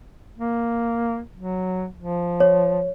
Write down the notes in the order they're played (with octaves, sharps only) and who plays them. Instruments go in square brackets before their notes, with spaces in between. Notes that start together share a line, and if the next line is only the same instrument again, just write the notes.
[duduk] A#3
F#3
F3
[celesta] C#5